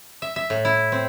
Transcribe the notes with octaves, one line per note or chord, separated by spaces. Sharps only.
E5
E5
A2
E4
C4